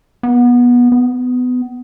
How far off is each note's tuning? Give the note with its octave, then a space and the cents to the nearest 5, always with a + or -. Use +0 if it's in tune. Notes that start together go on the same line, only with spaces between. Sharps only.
B3 -20
B3 +20